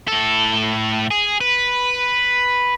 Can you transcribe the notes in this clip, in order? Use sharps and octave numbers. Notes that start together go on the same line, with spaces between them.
A2 A4
G#4
B4